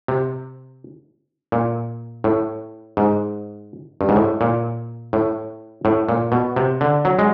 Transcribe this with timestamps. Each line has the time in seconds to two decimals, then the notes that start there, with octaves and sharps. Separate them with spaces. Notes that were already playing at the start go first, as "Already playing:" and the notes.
0.08 C3
1.52 A#2
2.24 A2
2.97 G#2
4.01 G2
4.09 G#2
4.16 A2
4.41 A#2
5.13 A2
5.85 A2
6.09 A#2
6.32 B2
6.56 C3
6.81 D3
7.05 F#3
7.19 G#3